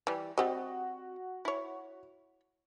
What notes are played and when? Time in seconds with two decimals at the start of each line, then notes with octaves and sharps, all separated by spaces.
0.07 E3 G3
0.38 G3 C4 F#4 D#5
1.45 E4 C#5